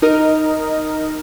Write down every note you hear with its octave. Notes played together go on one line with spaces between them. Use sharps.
D#4 A#4 D#5